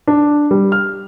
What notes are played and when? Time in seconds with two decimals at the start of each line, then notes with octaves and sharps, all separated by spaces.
0.07 D4
0.51 G3
0.72 F6